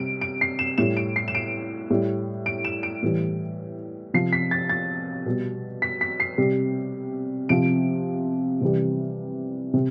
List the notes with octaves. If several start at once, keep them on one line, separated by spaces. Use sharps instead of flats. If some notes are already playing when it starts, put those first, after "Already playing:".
Already playing: C3 G3 D7
D7
C7
E7
A2 G3 E7
D7
C7
E7
D7
A2 G3
D7
E7
D7
A2 E3 G3
C3 F3 C7
B6
A6
A6
B2 G3
B6
B6
C7
C3 G3
C3 F3 D7
C3 E3 G3
C3